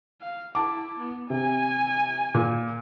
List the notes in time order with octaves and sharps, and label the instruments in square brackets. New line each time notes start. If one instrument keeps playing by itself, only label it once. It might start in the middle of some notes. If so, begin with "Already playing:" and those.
[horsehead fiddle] F5
[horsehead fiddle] E4 [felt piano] A5 D6
[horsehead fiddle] B3
[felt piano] C3 [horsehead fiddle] G#5
[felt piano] A#2